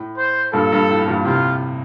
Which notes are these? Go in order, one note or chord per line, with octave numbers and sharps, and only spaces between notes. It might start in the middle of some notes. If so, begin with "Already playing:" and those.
Already playing: A2
C5
G2 A#2 A4
G2
A2
G2 A#2
A2 C3 F4